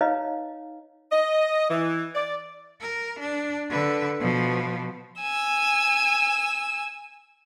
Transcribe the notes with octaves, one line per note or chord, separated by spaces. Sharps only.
D#4 B4 C#5 D#5 F5 A#5
D#5
E3
D5
A#4
D4
D3 B4
B2 F3
G#5 E6